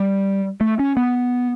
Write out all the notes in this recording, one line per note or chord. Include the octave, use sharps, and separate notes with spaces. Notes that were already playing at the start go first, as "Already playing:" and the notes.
Already playing: G3
A3
C#4
B3